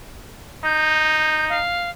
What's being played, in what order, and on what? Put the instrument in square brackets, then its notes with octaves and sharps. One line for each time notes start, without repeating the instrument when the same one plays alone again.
[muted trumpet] D#4 [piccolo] G6
[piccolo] F5